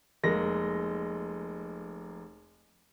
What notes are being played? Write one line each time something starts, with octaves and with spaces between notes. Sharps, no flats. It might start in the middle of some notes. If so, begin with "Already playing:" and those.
F1 G#3 A#3 A#6